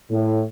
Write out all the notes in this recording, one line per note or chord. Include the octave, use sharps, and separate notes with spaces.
A2